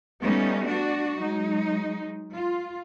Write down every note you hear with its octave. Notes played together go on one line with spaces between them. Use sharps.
G3 A3 B3 C#4 D#4
D4 F#4
F#3 G#3 D#4
F4